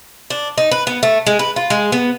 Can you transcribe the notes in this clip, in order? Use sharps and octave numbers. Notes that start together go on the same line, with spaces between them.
D4
D#4
B4
B3
A3
G#3
B4
F4
G#3
B3